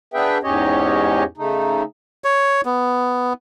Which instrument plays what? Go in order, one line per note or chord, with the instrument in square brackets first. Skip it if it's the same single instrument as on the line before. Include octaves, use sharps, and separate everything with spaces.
[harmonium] B3 D4 G#4 B4 E5 G5
E2 G#2 C#4 G4 C#5 D#5
C#3 A3 D#4
[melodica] C#5
B3